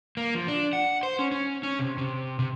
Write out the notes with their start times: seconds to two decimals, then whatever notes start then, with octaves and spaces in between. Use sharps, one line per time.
0.17 A#3
0.35 F3
0.48 D4
0.73 F#5
1.03 C5
1.19 C#4
1.32 C#4
1.63 C#4
1.79 C3
1.98 C3
2.39 C3